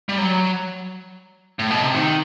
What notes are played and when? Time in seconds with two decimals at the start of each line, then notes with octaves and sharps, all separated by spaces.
0.09 G3
0.18 F#3
1.59 A2
1.71 B2
1.83 C3
1.95 D#3